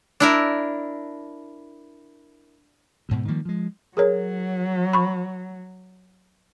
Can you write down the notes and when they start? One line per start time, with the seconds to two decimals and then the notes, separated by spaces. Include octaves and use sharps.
0.20 D4 E4 A#4
3.09 D2 G#2 B2
3.28 D#3 F3 G3 A#3
3.45 F3 G#3
3.97 F#3 G#4 A#4 C#5
4.93 B5 C#6